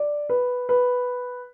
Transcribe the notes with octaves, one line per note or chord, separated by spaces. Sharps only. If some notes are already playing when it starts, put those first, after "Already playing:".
Already playing: D5
B4
B4